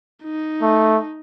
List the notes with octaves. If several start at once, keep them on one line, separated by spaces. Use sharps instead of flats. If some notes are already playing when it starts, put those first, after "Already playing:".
D#4
A3